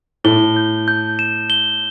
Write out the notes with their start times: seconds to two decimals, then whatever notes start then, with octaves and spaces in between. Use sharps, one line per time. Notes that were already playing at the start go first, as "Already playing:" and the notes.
0.24 A2 G7
0.57 G6
0.88 G6
1.19 E7
1.50 G7